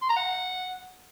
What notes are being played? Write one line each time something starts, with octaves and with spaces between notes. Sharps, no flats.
C6
A#5
F#5